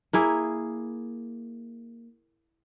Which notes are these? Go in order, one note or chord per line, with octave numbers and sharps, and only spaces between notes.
A#3 E4 G#4